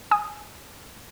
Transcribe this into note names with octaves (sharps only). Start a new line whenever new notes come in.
G#5 D#6